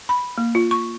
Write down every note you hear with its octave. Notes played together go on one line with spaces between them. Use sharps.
B5
A#3
F4
C#6